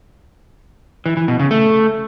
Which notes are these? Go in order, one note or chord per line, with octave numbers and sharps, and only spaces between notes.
E3
E3
B2
C#3
A3